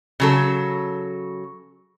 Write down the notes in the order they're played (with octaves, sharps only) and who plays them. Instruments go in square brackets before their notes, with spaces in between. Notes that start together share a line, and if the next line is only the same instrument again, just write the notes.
[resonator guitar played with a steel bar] C#3 F#3 A4